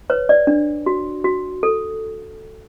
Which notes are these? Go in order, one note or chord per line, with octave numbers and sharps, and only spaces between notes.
B4 C#5
D5
D4
F#4
F#4
A4